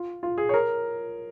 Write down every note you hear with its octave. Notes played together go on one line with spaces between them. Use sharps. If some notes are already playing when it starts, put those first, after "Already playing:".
Already playing: F4
F4
G#4
C#5
A#4